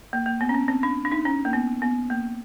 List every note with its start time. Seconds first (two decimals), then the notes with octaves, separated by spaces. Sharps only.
0.13 A#3
0.26 A#3
0.41 B3
0.49 C#4
0.54 C4
0.68 C4
0.83 D4
1.05 D4
1.12 D#4
1.25 C#4
1.45 A#3
1.53 B3
1.82 B3
2.10 A#3